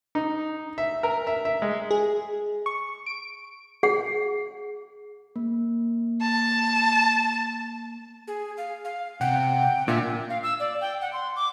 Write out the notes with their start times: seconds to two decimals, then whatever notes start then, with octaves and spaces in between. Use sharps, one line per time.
0.15 D#4
0.78 E5
1.03 A#4
1.27 E5
1.45 E5
1.62 G#3
1.91 G#4
2.66 C#6
3.06 D7
3.83 G#4 F#5
5.36 A#3
6.21 A5
8.28 G#4
8.58 F5
8.85 F5
9.21 C3 C4 F#5 G5
9.88 A#2 D4 E5
10.30 F5
10.43 E6
10.60 D5
10.81 G5
11.01 F#5
11.13 C6
11.36 D6